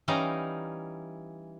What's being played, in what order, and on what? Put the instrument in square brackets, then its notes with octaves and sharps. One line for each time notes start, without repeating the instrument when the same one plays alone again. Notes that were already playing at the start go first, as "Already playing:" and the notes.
[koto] E3 G3 C#4 D#4 F5 A#5